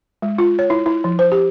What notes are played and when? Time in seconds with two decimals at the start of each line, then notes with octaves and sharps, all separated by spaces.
0.22 G#3
0.38 F4
0.59 C#5
0.70 E4
0.86 E4
1.04 F3
1.19 C5
1.32 G4